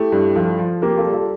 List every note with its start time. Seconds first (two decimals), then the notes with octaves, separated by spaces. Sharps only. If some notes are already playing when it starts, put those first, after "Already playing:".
Already playing: A3 E4 G4
0.12 G2
0.35 F3 F4 A4
0.59 F3
0.82 A#3 G4 A#4
0.97 F4 A4
1.05 G3
1.13 F4 A4